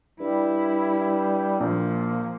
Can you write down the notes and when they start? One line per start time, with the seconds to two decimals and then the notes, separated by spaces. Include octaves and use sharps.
0.20 G2 G3 E4
1.60 A#1 F3 A#3